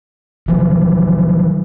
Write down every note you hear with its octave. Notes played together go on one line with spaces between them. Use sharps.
D#3 F3 F#3